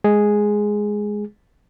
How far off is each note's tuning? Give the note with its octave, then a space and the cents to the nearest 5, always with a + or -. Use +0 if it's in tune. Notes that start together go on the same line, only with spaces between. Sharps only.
G#3 +0 G#4 +0